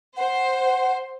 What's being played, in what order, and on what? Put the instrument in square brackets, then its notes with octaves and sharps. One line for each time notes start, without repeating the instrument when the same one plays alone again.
[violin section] C5 [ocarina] F#5